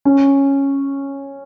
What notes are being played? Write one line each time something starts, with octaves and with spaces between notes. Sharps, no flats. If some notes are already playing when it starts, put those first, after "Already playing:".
C#4